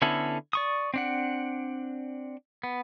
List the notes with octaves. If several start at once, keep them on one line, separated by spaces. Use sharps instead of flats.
D3 B3 C#4 E4 A4
D5 C#6 D#6
C4 D4 F#5
B3